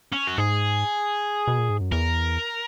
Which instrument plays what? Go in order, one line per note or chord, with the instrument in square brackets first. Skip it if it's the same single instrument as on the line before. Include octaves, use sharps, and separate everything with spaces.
[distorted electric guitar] C#4
F#4
[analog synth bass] G#2 [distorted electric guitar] G#4
[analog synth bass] B2
A#2
G#2
F#2
[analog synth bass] E2 [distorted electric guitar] A#4